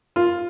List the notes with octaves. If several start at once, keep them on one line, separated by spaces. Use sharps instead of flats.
F4